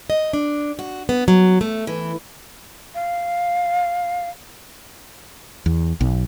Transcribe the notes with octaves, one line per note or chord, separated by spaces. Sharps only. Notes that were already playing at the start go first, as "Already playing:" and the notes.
D#5
D4
F#4
B3
F#3
A3
E3
F5
E2
B1